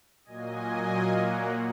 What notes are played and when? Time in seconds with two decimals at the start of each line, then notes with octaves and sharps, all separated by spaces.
0.25 A#2 F#3 A#3 D#5 G#5
1.19 F#5 A#5